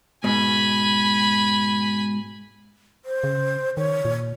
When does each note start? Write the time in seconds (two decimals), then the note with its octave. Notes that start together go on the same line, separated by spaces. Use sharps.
0.24 G#2 B2 G#5 B5
3.05 C5
3.24 C#3
3.77 D#3 C#5
4.05 A#2